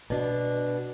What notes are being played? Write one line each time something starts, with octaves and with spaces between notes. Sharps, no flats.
B2 D4